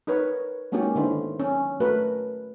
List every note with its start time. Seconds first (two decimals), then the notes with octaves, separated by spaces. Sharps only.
0.07 D#4 A#4 B4 C#5
0.72 G#3 A#3 C#4 D#4 F#4 G4
0.95 D3 D#3 B3 D4 E4 C5
1.40 C#4
1.80 A3 F#4 A#4 B4